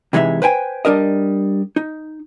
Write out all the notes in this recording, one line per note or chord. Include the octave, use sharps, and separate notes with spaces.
C3 E3 G#3 D#4 E5
B4 C5 G5 G#5
G3 D4 A#4 D#5
D#4